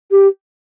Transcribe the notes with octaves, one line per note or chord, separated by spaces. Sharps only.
G4